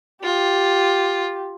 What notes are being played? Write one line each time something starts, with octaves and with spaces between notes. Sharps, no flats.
F4 G4